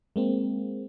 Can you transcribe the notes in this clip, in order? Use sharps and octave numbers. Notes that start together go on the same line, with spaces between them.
G#3 A#3 C4